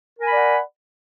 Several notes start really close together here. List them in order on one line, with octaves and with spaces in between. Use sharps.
A#4 G#5 B5 D5 F#5